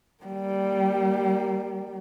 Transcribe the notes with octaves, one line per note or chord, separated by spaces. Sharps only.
G3 A#3